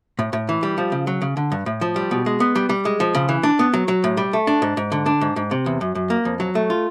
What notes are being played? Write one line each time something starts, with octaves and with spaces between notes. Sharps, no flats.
A2
A2
E3
G3
F3
C#3
F#3
C#3
D3
G2
A2
F3
G3
B2
G#3
B3
G3
G3
G#3
F3
C#3
E3
D4
B3
F#3
F#3
A2
G3
A3
D4
G#2
G#2
D3
D4
G#2
G#2
C3
E2
F#2
F#2
A#3
F2
F#3
A3
F4